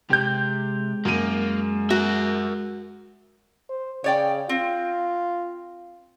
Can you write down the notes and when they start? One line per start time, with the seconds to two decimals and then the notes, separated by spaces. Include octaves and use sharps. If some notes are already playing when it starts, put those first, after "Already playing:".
0.10 C3 G#3 G4 G6
1.05 F#2 A#3 D#7
1.90 F#4 A#4 E5
3.70 C5
4.04 C#3 C#5 D5 G5
4.49 C4 F4